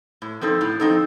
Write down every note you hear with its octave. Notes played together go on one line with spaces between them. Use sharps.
A2
F3 C4 D#4 A4
A2
F3 C4 D#4 A4